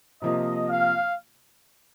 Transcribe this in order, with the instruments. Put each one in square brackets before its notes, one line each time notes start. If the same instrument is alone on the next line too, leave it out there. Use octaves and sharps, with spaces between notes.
[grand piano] C3 F3 A#3 F4 [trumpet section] D#5
[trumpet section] F5